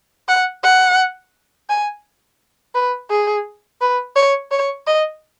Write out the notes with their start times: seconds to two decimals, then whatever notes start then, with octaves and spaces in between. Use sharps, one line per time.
0.28 F#5
0.63 F#5
1.69 G#5
2.74 B4
3.10 G#4
3.81 B4
4.16 C#5
4.51 C#5
4.87 D#5